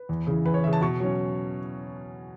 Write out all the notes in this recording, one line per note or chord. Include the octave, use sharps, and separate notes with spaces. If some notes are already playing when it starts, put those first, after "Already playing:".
Already playing: B4
E2
C#3 E3
E2 B4
C#5
C#3 E3 E5
A5
B2 C#6
F#3 C#4